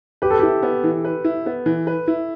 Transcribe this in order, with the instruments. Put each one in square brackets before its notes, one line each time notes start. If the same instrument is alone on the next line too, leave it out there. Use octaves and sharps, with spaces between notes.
[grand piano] G4 [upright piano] B4
[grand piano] A4
[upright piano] E4 [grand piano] G4
[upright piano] B3
E3
B4
E4
B3
E3
B4
E4